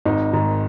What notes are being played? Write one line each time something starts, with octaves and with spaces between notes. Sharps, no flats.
G#1 D#4
G#2 D#3